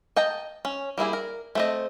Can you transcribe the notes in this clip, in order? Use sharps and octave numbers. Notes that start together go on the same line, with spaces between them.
D#5 G5 A5 A#5
C#4
G3 A#3 E4 G#4
A#4
A3 C4 D#5